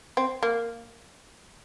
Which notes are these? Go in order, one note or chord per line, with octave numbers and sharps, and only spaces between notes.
C4
A#3